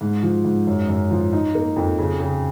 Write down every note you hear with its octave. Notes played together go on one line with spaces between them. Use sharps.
G#2
F3
G#2
F#2
F#2
F3
D#4
A#3
F2
C#3
C#3